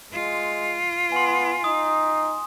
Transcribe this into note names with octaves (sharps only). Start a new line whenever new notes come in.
G#3 F4
B3 G#5 C6
D#4 D#6